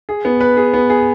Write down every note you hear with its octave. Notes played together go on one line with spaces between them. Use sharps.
G#4
B3
B4
G#4
B3
G#4